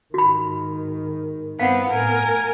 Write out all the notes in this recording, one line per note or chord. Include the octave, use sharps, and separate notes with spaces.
G#2 D#3 F#4 B5
G2 B3 C4 F5 F#5
A2 A#4 G#5